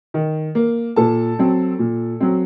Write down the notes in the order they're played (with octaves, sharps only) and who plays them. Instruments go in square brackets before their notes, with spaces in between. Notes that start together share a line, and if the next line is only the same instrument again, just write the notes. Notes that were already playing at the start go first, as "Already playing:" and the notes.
[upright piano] D#3
A#3
A#2 A4 A5
F#3 C4
A#2
F#3 C4